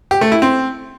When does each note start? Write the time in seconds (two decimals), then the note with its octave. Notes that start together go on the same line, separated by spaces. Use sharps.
0.11 G4
0.21 A3
0.32 E4
0.42 C4